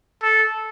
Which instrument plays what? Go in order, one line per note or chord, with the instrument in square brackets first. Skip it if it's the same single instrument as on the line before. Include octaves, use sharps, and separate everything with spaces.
[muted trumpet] A4